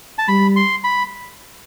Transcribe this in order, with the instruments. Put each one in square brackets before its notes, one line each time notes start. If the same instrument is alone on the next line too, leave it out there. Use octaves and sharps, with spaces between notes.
[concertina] A5
[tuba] G3 [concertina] B5
[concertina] C6
B5